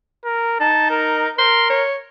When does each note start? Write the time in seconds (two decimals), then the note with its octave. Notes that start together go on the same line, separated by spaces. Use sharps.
0.25 A#4
0.60 D#4 A5
0.91 A#4
1.39 A#4 C6
1.70 C#5